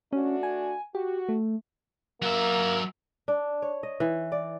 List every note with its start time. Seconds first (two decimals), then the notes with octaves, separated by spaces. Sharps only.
0.13 A3 C#4 D4 F#4
0.43 G#5
0.95 F#4 G4
1.29 A3
2.22 F#3 A#3 E5
3.28 D4
3.62 C#5
3.83 D#5
4.00 E3
4.32 D5